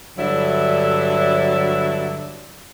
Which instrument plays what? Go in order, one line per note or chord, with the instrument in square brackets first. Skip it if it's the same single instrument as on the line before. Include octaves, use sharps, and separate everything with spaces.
[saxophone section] G2 D3 F#3 E4 D5 E5